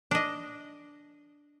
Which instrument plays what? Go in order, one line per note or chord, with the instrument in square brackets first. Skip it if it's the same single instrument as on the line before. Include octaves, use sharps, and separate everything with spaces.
[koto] D4 D#5